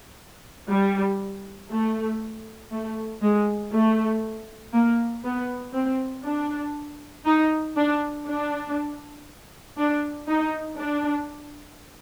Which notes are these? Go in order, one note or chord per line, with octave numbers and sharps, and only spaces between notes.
G3
A3
A3
G#3
A3
A#3
B3
C4
D4
D#4
D4
D4
D4
D#4
D4